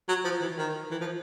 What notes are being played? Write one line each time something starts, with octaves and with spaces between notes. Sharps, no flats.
F#3
F3
E3
D#3
E3
F3